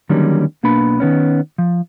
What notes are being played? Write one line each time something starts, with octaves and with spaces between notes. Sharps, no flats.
D3 D#3 F#3 G3 A#3 C#4
B1 A#3 B3 D4 B5
D#3 B3 C#4
F3